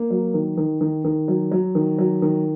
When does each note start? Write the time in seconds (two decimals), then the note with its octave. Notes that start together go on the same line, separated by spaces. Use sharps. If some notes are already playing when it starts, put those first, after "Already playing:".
Already playing: A#3
0.10 F#3
0.34 D#3
0.58 D#3
0.81 D#3
1.05 D#3
1.28 F#3
1.51 F#3
1.75 D#3
1.98 F#3
2.22 D#3